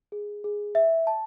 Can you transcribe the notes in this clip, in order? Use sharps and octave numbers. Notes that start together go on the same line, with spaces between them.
G#4
G#4
E5
A5